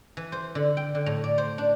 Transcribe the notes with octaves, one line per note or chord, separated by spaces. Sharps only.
E3
C5
D3
G5
D3
A2
D5
C5
D4